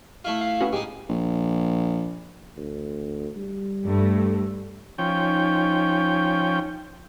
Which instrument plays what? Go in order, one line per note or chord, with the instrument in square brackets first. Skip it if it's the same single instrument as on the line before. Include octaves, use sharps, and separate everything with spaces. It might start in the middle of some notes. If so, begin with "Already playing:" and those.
[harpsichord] A3 E4 F4
[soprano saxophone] F5
[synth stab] B3 C#4 F#4
[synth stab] A2 [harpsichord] G#3 D#4 [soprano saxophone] G4
[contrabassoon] A#1
[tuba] D2
G3
[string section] G2 A3
[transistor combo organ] F3 C#4 G5 [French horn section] D#4